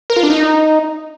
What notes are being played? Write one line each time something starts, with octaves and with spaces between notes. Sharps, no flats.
A#4
F4
D4
D#4